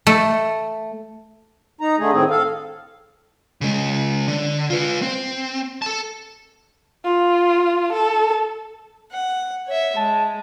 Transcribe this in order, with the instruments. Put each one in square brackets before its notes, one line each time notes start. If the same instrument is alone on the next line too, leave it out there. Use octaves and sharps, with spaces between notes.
[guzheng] A3
[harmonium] D#4 A#5
D3 A3 G#4
A2 D#3 C4 G#4
A4 F5
[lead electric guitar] C#3 G#3
D3
F4 B4
C4
A4 A5
[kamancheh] F4
A4
[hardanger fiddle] F#5
C#5 E5
[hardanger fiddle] G#3 [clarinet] A5